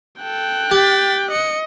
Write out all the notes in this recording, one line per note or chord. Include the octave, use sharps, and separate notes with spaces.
A4 G5 F#6
G4 A6 B6
D#5 C#7